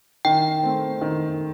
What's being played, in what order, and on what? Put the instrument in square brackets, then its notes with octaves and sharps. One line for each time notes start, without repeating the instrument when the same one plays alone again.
[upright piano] D#3 [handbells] G5
[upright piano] A3 C4
D#3